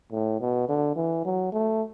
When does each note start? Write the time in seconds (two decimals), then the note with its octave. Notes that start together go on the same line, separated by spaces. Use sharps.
0.12 A2
0.41 B2
0.69 D3
0.96 E3
1.25 F#3
1.53 A3